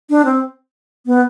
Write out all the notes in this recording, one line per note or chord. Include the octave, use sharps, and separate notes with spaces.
D4
C4
B3